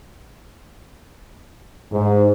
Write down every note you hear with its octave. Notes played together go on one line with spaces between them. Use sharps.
G#2